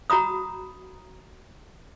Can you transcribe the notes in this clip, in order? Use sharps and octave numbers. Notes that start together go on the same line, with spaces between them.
F#4 A#5 B5 D#6